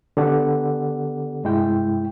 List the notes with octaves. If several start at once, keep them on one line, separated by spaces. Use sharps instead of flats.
D3 B3 G4 A4 D5 F#5
G2 C3 G#3 E4 G5